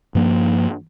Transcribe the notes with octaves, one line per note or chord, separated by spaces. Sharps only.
G2 F3 A#3